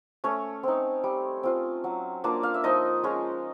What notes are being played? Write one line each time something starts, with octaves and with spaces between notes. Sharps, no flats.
A3 C#4 C#5
C4 D#4
G3
C4 F4
F#3
A#3 D4 F4
F5
E5
F3 D#4 D#5
G#3 C#4 F4